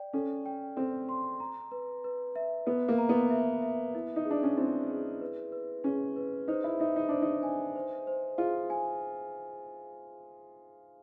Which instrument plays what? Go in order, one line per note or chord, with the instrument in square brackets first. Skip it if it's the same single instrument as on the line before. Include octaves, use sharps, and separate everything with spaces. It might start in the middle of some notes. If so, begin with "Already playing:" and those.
Already playing: [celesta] D5 G5
[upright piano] C#4 [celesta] A4
[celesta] G5
[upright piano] C4 [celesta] A4
[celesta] C6
A#5
B4
B4
E5
[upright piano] B3 [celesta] B4
[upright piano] A#3
[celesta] A#5
[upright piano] B3
[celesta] E5
E5
E4
[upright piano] D#4
[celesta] G#4
[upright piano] D4
C#4
[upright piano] C4 [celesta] E4
[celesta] G#4
B4
B4
[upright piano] C#4 [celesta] G#4
[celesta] B4
[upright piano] D#4 [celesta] C5
[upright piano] E4
[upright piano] D#4 [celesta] E5
[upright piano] D#4
[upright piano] D4 [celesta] C5
[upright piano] D#4
[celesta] G#5
C5
C5
[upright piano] F4 [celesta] G#4
[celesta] G#5